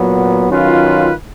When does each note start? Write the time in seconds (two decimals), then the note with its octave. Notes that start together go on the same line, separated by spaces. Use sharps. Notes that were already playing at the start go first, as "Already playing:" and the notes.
Already playing: A#2 F#3 B3
0.49 D#3 F#3 C#4 F4 B4